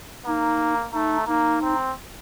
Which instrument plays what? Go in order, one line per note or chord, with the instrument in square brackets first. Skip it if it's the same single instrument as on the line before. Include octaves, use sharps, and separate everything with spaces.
[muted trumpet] A#3 [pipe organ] D#4
[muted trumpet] A3 [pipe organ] D#4
[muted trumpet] A#3 [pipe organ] D#4
[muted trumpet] C4